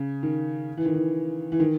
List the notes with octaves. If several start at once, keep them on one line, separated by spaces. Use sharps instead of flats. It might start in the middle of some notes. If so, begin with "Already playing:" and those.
Already playing: C#3
D#3
E3
D#3
E3
E3
D#3